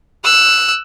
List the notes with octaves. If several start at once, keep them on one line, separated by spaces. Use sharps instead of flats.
E6 F#6